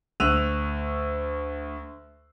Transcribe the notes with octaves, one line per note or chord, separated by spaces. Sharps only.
D2 E6 F#6 D#7 F7